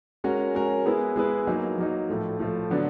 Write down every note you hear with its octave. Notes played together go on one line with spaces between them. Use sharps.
G#3 C#4 F#4 A#4
G#3 C#4 F#4 A#4
G#3 B3 E4 G#4 B4
G#3 B3 E4 G#4 B4
F#3 A#3 D#4
F#3 A#3 D#4
A2 F3 A3
A2 F3 A3
D3 F#3 B3 D4